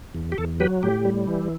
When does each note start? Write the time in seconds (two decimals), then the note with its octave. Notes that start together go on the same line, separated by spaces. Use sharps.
0.15 E2
0.32 G4
0.38 E2 A4
0.60 F#3 G4 B4
0.83 A2 G4
1.05 G3
1.28 E3